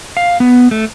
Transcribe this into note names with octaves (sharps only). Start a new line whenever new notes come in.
F5
B3
A3